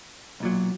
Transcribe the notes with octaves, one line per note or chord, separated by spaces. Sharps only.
B1 A#2 F#3